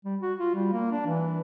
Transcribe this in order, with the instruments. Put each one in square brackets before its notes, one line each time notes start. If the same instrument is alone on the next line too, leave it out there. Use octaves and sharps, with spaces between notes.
[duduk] G3
F#4
F4
G3
A#3
D4
E3